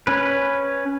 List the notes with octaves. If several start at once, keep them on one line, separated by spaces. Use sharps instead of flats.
C#4 B4